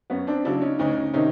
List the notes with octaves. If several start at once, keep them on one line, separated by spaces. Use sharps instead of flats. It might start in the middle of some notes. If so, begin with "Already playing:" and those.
F#2 B3 C#4
C4 D4
C#3 F#3 D4 E4
C#4 D#4
D2 C#4 D#4
C3 D#3 C#4 D#4